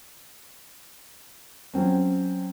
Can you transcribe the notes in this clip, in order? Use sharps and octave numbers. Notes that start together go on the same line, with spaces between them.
F#3 C4 C#4